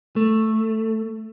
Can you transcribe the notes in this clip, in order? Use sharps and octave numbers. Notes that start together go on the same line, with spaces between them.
A3